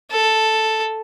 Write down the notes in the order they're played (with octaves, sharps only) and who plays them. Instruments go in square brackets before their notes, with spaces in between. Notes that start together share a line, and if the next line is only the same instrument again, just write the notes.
[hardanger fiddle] A4